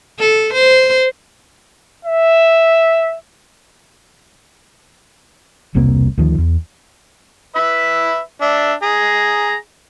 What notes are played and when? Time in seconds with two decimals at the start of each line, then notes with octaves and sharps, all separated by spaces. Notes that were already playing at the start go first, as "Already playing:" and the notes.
0.19 A4
0.53 C5
2.05 E5
5.75 E1 C2 C3 A#3
6.18 D2 D#3 F3
6.38 E2
7.55 B4 E5 B5
8.42 D4 E5
8.83 G#4 A#5